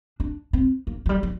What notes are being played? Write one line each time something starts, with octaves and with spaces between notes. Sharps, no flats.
D4
C4
A#3
F#3
G3
F#3